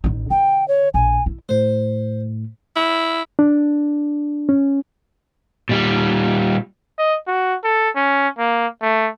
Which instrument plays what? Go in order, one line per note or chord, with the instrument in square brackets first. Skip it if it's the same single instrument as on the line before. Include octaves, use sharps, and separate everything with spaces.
[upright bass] A1 D#4
[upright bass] D3 [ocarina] G5
[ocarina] C#5
[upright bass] A#1 [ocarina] G#5
[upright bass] E4
[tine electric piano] A2 A3 [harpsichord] C5
[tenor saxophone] E4
[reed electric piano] D4
C#4
[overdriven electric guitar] A#2 G3
[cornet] D#5
F#4
A4
C#4
A#3
A3